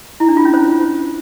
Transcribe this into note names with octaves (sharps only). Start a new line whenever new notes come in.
E4
D4
F4
C#4
C5